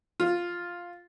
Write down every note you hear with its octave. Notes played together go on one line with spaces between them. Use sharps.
F4